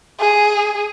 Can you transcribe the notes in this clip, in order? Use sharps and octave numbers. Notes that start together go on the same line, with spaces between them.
G#4